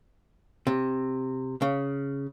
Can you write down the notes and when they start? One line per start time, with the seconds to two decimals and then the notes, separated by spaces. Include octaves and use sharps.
0.67 C3
1.62 C#3